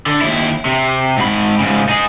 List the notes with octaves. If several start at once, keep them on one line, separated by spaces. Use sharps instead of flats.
D3
D#2 E4
C3
G#2 B5
G#2 C#3
D#4 G#4